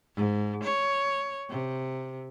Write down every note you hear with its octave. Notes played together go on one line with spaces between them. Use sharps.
G#2
C#5
C3